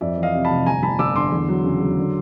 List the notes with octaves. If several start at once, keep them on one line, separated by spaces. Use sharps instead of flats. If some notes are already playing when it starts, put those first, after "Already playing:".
F2 D5 E5
E3
D#5 F5
C3
A5 B5
F1
G1 G#5 A#5
G1 A5 B5
G1 D6 E6
D3 C6 D6
E2
F#3
C#3
F#3
D3